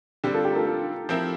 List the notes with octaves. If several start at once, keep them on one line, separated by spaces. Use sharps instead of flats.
D3 G3 C4 G4
F4 A4
G4
A#4
F4 A4
F4 A4
F3 C4 E4 A#4